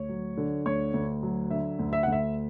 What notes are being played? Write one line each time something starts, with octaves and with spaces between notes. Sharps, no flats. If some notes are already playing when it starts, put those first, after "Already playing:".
Already playing: D2 C#5
F#3
D3
D2 C#5
D2
F#3
D3 E5
D2
E5
D2 F#5
E5